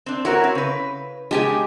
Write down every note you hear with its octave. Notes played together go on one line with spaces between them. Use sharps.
C4 D4
E4 F#4 A#4 C#5
C4
C#3 B4
C#3 G#3 D4 G4 G#5